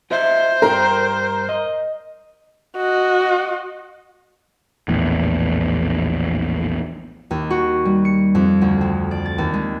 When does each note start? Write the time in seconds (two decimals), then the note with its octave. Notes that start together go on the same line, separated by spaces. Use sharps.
0.11 F#4 C5 D#5 E5
0.62 G2 G4 A#4 A#5
1.49 D#5
2.76 F#4 D#5
4.88 A#1 E2 A2
7.31 D#2
7.50 F#4
7.85 G3
8.05 C#7
8.35 F2
8.61 D2
8.81 C4
9.11 D5
9.26 A6
9.38 D#2
9.54 G#3